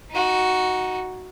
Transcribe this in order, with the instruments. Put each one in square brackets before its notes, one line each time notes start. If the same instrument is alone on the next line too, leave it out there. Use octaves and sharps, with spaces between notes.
[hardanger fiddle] D#4 F#4